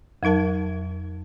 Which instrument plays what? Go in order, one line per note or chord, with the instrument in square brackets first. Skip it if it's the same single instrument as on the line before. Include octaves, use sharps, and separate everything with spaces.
[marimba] F2 F#3 D#4 A#4 A5